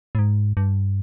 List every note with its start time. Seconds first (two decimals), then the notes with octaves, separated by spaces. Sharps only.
0.15 A2
0.19 G#2
0.57 G2